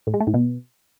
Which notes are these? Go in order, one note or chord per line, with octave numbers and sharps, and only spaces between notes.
A2
G#3
A3
A2
B2